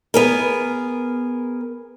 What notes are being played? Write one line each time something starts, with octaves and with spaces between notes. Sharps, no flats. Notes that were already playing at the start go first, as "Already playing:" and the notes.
B3 G#4 A#4